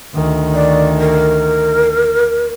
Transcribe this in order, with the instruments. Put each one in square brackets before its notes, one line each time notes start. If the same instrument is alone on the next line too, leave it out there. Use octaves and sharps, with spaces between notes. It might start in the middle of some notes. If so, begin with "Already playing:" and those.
[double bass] D2 D#3
[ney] D5
A#4